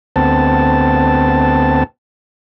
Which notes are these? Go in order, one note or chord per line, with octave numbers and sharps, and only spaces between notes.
D2 B3 C4 A5